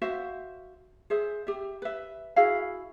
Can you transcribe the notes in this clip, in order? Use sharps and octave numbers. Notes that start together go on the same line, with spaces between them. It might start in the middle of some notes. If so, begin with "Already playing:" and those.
F#4 C5 E5 F5
G#4 C5 E5
G4 E5
B4 E5
E4 F#4 G#4 F5